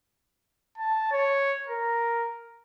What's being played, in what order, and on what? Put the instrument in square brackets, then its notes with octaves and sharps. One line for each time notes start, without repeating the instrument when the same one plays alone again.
[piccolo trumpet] A5
C#5
A#4